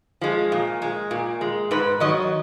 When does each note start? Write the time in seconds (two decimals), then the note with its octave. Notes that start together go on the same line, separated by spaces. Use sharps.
0.21 F3 G#3
0.52 A#2
0.82 G#3
1.11 A#2
1.41 G#3
1.71 G#2 B4
2.00 D#3 F#3 D#5